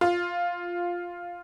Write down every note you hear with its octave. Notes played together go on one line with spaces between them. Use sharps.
F4